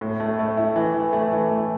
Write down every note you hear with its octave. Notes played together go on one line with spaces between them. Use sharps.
A2
A3
A3
E4
E3
E3
A3
E3
A3